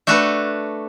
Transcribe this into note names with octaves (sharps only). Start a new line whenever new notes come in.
A3 D4 F#4 A4 B4